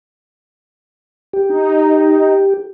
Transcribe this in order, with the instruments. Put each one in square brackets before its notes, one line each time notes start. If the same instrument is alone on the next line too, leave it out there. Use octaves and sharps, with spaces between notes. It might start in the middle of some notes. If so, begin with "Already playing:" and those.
[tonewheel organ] G4
[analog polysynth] D#4